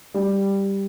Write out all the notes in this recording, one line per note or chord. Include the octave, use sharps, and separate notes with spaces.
G3